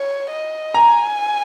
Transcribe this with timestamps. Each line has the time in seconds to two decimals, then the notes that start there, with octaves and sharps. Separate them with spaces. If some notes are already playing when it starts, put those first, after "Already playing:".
Already playing: C#5
0.30 D#5
0.74 G#5 A#5